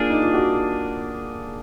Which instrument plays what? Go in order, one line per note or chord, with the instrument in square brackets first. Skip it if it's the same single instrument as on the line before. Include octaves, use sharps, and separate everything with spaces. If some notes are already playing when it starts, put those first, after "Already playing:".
Already playing: [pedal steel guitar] A#3 D4 G#4 [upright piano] F4
[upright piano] D#4
F4
F#4